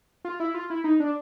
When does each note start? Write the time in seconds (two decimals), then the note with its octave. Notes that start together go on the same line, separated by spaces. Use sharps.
0.25 F4
0.40 E4
0.54 F4
0.70 E4
0.84 D#4
1.00 D4